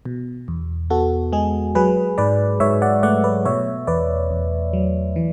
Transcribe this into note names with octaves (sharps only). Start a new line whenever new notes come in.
B2
E2
B3 F#4 A4
G#3 G#4
F#3 G#4 B4
G#2 B4 D5
G#2 C#5 E5
D5 F#5
A3 D5 F#5
B4 D5
B2 C#5 E5
E2 B4 D5
E2
F#3
E3